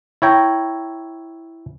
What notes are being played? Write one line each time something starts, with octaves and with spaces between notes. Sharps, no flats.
E4 C#5 G5 A#5